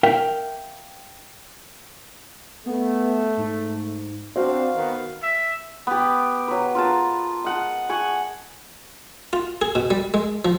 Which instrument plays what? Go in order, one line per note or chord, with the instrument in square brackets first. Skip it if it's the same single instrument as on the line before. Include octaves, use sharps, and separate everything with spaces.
[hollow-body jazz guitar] A#4 E5 F5 G5
[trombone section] A3 [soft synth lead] B3
[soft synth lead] G#2
[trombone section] C4 D4 [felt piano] F#4 C5 [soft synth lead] F5
[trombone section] D#3 B3
[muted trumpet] E5
[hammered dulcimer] B3 G4
F#3 B4
F4 A#4 A5
D#5 F#5 A5
F#5 G#5 C#6
[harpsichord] F4
G#4
B2
G3
G#3
F3